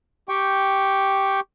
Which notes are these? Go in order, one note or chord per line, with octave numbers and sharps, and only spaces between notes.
G4 G5 C#6